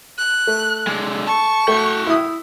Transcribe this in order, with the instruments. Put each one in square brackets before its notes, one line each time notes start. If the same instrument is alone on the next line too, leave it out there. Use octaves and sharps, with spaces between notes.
[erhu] F#6
[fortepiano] A3
[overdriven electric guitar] D3 G#3
[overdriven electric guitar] A5 [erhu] C#6
[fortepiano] A3 [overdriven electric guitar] F#4 G5
[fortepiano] E4 D#6